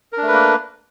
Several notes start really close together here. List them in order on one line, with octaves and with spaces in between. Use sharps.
A#4 D4 A3 B4 A#3